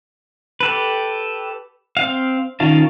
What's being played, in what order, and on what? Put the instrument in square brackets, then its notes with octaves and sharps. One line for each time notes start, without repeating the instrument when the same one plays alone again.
[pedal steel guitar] G4 A4 B4
C4 F5
D#3 C#4 F4 F5 A5